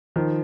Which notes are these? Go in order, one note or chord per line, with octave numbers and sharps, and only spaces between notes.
D#3 F3